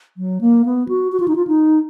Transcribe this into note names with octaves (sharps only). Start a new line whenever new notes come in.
F#3
A#3
B3
F#4
F#4
F4
D#4
F4
D#4